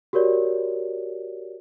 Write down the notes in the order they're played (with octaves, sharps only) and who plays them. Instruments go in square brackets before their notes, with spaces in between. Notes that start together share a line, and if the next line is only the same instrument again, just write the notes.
[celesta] F#4 G4 A#4 C#5 D5